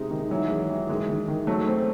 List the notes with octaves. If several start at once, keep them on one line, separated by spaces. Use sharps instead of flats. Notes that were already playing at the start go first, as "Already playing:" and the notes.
Already playing: C3 G#3 D#4
D#3
E3 F#3
G#3
E3
D#3 G#3
D#3
D#3
F#3 A3
C4